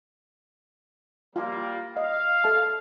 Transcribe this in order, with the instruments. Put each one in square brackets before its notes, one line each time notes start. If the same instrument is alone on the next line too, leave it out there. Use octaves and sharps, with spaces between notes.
[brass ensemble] G3 A#3 [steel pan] F4 F5
[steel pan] D#5 [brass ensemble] F5
[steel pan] A4 E5 A5